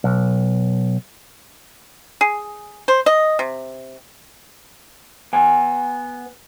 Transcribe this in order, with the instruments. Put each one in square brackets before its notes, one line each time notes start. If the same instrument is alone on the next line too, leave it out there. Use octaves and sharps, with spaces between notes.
[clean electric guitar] B1
[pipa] G#4
C5
D#5
C3
[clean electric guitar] B3 G#5